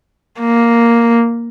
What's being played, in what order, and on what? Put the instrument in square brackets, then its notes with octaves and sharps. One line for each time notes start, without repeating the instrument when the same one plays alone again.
[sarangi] A#3